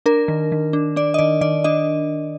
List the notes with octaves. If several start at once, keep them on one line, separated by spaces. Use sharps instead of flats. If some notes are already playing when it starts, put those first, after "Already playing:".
D4 A#4
D#3
D#3
D4
D4 D5
D#5
D#3 D5
D#3 D5
D4 D#5